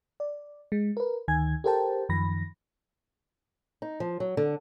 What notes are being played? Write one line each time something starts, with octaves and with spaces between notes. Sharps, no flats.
D5
G#3
A#4 B4
D2 D#3 G#5 G#6
G4 A4 A#4 C5 G5 A5
F#2 D#3 F3 B5 A#6
D#4
F3
F#3
D3